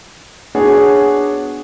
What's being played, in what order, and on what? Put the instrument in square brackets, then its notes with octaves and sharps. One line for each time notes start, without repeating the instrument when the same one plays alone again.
[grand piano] B3 D4 F#4 G#4 C#5